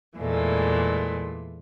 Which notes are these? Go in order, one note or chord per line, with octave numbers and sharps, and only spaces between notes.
E2 A#2 E3 G#3 A3